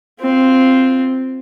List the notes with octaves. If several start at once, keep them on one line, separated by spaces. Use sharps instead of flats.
C4 F4